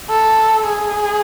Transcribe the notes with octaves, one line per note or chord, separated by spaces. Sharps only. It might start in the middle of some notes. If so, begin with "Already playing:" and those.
A4
G#4